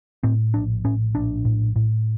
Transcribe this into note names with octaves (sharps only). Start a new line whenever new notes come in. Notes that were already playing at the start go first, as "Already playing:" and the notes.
A2 C4
A#1 D4
A2 C#4
A#1 D4
A2
A2